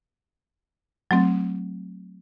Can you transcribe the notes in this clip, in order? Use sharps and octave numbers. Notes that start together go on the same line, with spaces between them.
F#3 A3 C4